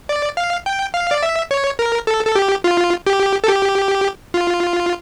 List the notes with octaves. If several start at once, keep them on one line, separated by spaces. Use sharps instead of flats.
D5
F5
G5
F5
D5
E5
C#5
A#4
A4
A4
G4
F4
G4
A4
G4
F4